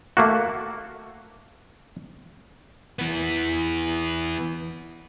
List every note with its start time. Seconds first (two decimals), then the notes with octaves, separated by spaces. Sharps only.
0.17 A3 A#3 F#4
2.99 E3 B3